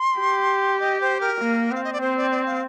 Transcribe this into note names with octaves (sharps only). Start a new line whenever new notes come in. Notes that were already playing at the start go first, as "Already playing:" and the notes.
Already playing: C6
G4
D#5
C5
A#4
A#3
C4 F5
D#5
D5
C4 C5
D5
D5
F5